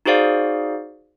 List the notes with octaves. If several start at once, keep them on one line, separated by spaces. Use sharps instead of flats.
D#4 F#4 G#4 C5 D5 F5